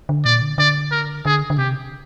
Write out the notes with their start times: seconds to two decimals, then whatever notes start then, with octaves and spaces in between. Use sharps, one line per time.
0.09 D3
0.25 A#2 D5
0.42 D3
0.58 D3 D5
0.91 A#4
1.25 D3 G#4
1.50 D3
1.58 C3 G4